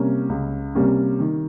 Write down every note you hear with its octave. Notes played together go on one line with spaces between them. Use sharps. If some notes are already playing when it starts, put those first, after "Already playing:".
Already playing: C3 G3 A#3 C#4
C#2
C3 G3 A#3 C#4
D#3